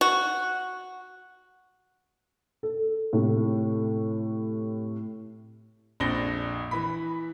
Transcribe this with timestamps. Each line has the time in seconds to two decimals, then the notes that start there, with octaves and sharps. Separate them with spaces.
0.01 F#4
2.63 A4
3.13 A2 C3
6.00 A#1 F2 D4 A#6 G7
6.71 E3 B5